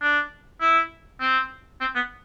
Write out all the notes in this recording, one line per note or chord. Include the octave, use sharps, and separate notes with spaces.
D4
E4
C4
C4
B3